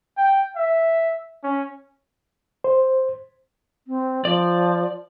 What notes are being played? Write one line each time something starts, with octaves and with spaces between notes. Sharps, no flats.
G5
E5
C#4
C5
C4
F3 D5